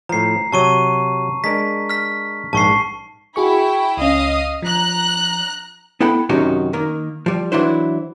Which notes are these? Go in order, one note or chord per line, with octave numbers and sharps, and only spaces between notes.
A2 F3 A#5 C7
C3 F#3 A5 C#6 D#7
G#3 D4 A#4 B6
F6 B6
A#1 G#2 A5 C#6 C7
E4 F#4 G#4 G5 C#6
C#2 C#4 D#5 F5 D#6
F3 A#5 F#6
B3 E4 A4 F#5 G5 B5
F#2 C3 D#3 C#4 D#4 F#4
D#3 A#3
F3 G3
E3 F#3 D4 E4 C5